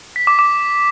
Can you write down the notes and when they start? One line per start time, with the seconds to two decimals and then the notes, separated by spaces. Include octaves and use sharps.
0.16 B6
0.27 D6
0.39 D6